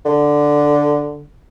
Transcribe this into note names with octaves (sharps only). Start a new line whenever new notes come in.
D3